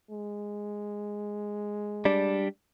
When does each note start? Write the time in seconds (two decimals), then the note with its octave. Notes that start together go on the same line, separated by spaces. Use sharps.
0.11 G#3
2.05 G3 D4